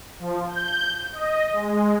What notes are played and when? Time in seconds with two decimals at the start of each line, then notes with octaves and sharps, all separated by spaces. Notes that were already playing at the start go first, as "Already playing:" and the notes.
0.19 F3
0.49 G6
1.13 D#5
1.52 G#3